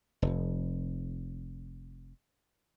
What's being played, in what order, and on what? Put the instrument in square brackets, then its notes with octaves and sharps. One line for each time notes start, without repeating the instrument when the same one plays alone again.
[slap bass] F1 F2